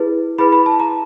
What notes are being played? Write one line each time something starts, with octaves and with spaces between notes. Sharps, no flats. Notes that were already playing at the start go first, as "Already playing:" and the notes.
Already playing: E4 G#4 B4
E4 G#4 B4 B5
B5
A5
A#5